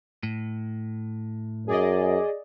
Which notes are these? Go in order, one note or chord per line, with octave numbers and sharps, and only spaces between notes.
A2
F#2 G#4 D5 D#5